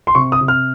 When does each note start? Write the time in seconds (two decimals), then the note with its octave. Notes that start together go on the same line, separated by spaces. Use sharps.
0.07 C6
0.15 C3 C#6
0.32 D#6
0.41 C3
0.48 F6